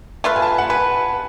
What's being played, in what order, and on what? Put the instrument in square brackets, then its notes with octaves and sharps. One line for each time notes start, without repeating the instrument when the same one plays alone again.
[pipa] A3 F4 B4
[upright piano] G#5
A5
G#5
F#5
[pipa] B4 [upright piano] G#5